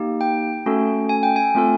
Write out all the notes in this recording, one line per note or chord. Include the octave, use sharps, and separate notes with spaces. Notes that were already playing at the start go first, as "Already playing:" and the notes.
Already playing: A#3 D#4 G4
G5
A3 C#4 F#4 A4
G#5
G5
G#5
A3 C4 F4 A4